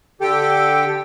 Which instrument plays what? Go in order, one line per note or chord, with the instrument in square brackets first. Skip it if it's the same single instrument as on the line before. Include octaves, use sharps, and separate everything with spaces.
[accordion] D3 G4 A4 G5